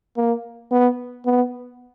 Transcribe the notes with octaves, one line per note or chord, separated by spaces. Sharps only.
A#3
B3
B3